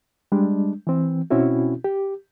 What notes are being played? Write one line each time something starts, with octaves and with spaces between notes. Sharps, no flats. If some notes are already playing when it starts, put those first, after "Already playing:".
G3 G#3 D4
E3 C4
B2 C4 C#4 E4 F#4
G4